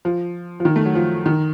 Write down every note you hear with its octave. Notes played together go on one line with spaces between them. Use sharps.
F3
F3
D#3
A3
F#3
F3
D#3